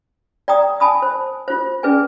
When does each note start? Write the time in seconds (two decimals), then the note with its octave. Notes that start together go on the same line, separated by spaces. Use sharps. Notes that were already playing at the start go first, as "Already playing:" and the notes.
0.48 D5 G5 A#5 D#6
0.80 G#5 A5 B5 D#6
1.02 C5
1.48 F4 C5
1.83 C#4 G#4 B4 D5 G#5